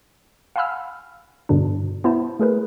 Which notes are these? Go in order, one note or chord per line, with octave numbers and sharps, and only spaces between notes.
F5 F#5 G#5 B5 E6 F6
G2 B2 D3 D4
B3 E4 C5 A5
A3 G#4 A#4 B4